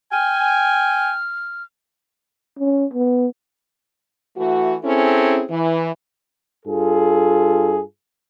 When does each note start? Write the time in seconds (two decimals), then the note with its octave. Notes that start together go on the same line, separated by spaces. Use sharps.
0.12 G5 G#5 F6
2.59 C#4
2.93 B3
4.37 E3 A3 F#4
4.84 C4 C#4 E4 G#4 A4
5.50 E3
6.66 G2 F4 G#4 A4